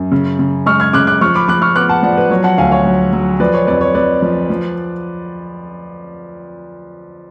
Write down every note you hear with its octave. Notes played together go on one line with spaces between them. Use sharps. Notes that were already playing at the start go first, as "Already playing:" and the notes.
Already playing: F#2
C#3
C#3
G#3 C#6 F6
F6 G#6
C#3 D6 F#6
D6 F#6
F3 C#6 F6
B5 D6
F3 D6 F#6
C#6 F6
B3 D6 F#6
F#5 A5
F3 D5 F#5
B4
F#3 C#5
F#5 A5
D2 F5 G#5
C#5 F5
F#3
F#3
F3 B4 D5
C#5
F2 B4 D5
C#5
F2 B4 D5
F3
F3